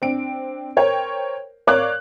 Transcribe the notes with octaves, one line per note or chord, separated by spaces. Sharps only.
C4 D4 D7
A#4 C5 C#5 G5
A#4 C#5 D5 F5 D6 F#6